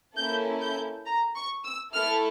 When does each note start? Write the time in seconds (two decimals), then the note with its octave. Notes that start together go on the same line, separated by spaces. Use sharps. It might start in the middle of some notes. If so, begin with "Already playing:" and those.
0.17 A#3 C#4 E4 A4 G6
0.61 G6
1.06 A#5
1.36 C#6
1.65 E6
1.94 A3 E4 A4 F6